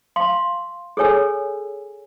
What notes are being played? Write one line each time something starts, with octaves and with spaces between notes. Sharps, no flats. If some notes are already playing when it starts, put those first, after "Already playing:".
F5 C6
G#4 A4 C#5 G#5 E6